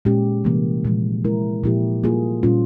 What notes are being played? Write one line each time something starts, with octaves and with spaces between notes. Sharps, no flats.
A#2 G#3 C#4 G4
C3 E3 G3 A#3
A#2 F3 G#3
G#3 E4 A#4
A#2 F3 A#3 E4 G4
G3 A#3 F4 G#4
A#2 G3 C#4 F4